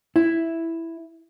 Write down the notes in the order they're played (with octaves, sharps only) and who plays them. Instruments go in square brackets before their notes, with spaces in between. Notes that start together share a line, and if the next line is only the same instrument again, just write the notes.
[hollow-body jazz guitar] E4